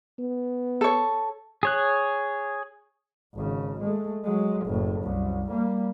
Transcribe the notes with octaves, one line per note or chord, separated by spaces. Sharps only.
B3
A4 C#5
G#4 C#5 F#6
G#1 C#3
G#3 A3
F#3 G#3
F#1 A2
C2 F#2
G3 A#3